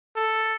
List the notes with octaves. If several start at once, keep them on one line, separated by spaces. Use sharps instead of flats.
A4